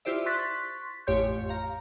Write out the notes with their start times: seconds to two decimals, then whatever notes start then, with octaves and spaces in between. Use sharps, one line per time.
0.05 E4 F4 G4 C5 D5 E5
0.26 C6 C#6 F#6 A6 B6
1.07 A1 F2 G4 C#5 C6 G6
1.49 F5 A#5